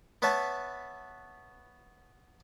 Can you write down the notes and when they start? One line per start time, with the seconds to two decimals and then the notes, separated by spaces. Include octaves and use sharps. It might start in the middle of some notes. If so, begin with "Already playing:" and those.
0.22 B3 B4 C#5 E5 A5